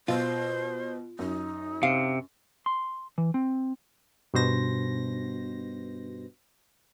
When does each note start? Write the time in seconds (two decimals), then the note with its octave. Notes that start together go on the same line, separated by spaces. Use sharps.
0.08 B2 F4 C5
1.19 F#2 D#4
1.83 C3 F5
2.66 C6
3.18 E3
3.34 C4
4.34 G2 B2 C5 A#6